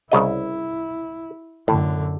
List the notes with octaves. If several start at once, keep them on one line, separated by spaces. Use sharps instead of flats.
C2 C#3 E4 D#5
F#2 A2 D3